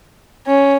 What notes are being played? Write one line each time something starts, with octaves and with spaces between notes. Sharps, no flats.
C#4